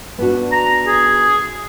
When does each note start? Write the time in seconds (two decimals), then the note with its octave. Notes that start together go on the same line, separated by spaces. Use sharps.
0.18 B3 D4 F#4
0.52 A#5
0.87 G#4